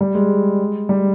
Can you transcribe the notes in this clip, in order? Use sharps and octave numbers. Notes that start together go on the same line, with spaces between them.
G3
G#3
G3